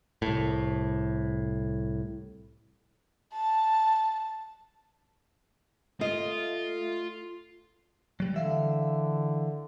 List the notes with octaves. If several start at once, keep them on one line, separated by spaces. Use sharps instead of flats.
C2 A2
A5
A3 F4 D#5
F#3 G3
D3 E3 E5 F5